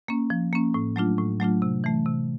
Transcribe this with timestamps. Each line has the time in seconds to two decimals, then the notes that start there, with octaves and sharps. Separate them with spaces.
0.08 A#3 C#4
0.30 F3
0.53 A#3 C#4
0.74 A2
0.96 F#3 A3 D4 F4
1.18 A2
1.40 F#3 A3 D4 F4
1.62 C3
1.84 E3 A3
2.06 C3